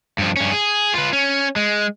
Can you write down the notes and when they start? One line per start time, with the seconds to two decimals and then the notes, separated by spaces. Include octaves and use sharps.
0.18 G2 F3
0.36 G2 C#4
0.51 G#4
0.94 F4 B4
1.13 C#4
1.56 G#3